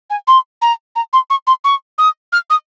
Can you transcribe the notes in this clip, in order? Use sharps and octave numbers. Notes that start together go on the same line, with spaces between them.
G#5
C6
A#5
A#5
C6
C#6
C6
C#6
D#6
F6
D#6